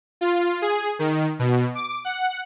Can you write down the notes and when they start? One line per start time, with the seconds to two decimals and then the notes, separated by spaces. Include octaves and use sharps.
0.21 F4
0.62 G#4
0.99 D#3
1.39 B2
1.75 D6
2.05 F#5